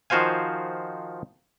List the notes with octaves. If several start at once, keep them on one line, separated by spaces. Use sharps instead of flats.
D#3 F3 F#4 C5 F5 G#5